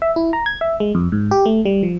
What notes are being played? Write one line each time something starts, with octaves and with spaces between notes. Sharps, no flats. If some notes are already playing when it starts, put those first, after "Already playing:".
E5
E4
A#5
G#6
E5
G#3
F2
G#2
G4
A3
G3
F3